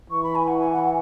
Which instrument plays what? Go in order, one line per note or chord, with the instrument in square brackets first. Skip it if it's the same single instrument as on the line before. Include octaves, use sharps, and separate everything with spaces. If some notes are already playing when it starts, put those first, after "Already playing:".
[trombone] E3 [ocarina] C#6
[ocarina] B5
G#5
F#5
G#5
F#5
F#5